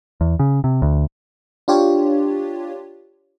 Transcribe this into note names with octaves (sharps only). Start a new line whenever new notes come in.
E2
C#3
C3
D2
D4 F4 G4 C#5